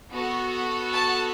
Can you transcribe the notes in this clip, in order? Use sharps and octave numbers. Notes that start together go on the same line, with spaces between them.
B3 F#4 A4
A5